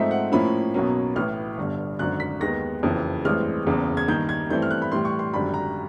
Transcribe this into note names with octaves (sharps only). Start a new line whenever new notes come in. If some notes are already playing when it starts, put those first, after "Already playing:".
Already playing: G#2 F3 A3 C4 D#4 E5
F#5
A2 F3 A#3 C#4 E4 B5
B1 B2 F#3 A#3 C#4
A1 A2 E3 F6
G1 G2 D3
G#1 F#2 D3 F#6
B6
D#2 D#3 G#3 B3 A#6
F#1 F2 C#3 E3
A1 G2 E3 G#3 C4 F6
F#1 E2 C#3
G#6
G2 D#3 G3 A#3 G6
G#6
G2 E3 A3 C4 E4 G6
F6
F#6
B5
A2 E3 G3 C6
C#6
C6
G#1 F#2 D3 G3 B5
A#5